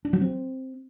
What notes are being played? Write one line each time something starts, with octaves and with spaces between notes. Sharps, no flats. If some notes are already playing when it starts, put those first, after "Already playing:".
D4
F#3
C4